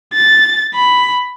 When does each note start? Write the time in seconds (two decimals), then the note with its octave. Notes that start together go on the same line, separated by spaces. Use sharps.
0.13 A6
0.74 B5